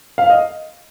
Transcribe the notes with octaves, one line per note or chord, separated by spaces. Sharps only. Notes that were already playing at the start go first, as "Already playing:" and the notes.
F5
D#5